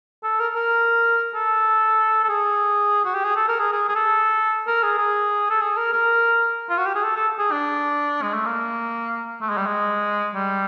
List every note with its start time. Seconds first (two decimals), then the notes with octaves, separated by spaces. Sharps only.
0.24 A4
0.40 A#4
0.55 A#4
1.35 A4
2.24 A4
2.29 G#4
3.05 F#4
3.14 G4
3.24 G#4
3.36 A4
3.48 A#4
3.59 G#4
3.72 G#4
3.88 G#4
3.95 A4
4.67 A#4
4.83 G#4
4.98 G#4
5.50 A4
5.61 G#4
5.77 A#4
5.93 A#4
6.69 F4
6.78 F#4
6.86 G4
6.95 G#4
7.04 A4
7.16 A4
7.39 G#4
7.52 D4
8.22 G#3
8.34 A3
8.46 A#3
9.41 A3
9.49 G#3
9.57 G3
9.66 G#3
10.35 G3